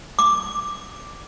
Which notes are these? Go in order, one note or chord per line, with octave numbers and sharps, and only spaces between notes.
D6